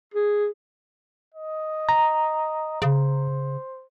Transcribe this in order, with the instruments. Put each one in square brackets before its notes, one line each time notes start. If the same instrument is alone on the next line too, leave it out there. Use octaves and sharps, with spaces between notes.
[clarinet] G#4
[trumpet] D#5
[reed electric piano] A#5
[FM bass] C#3 [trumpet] C5